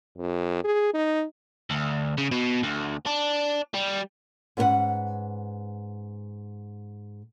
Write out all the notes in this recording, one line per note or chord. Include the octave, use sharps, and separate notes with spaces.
F2
G#4
D#4
D2
C#3
B2
D2
D4
G3
G#2 B3 C#4 A#4 B4 F#5